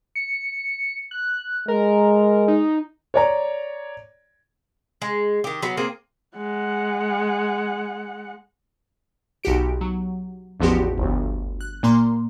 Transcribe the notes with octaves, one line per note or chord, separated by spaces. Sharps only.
C#7
F#6
G#3 A#4
D#4
C#5 D5 A#5
G#3
D#3 G4
F#3 B3
A#3 C4 G#4
G#3 F#5
B1 F#4 G4 D7
F#3
A1 E2 F3 B3 F#4 G4
G1 D2
F#6
A#2 A#3 A#5 C6